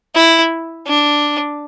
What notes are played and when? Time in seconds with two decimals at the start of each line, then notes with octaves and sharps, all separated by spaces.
0.15 E4
0.87 D4